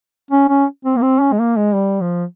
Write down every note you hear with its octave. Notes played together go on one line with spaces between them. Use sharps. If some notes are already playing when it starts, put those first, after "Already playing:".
C#4
C#4
C4
A#3
C4
C#4
G#3
A#3
G#3
G3
F3